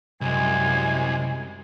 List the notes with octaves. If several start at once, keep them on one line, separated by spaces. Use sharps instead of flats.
C2 F#2 G#3 G#5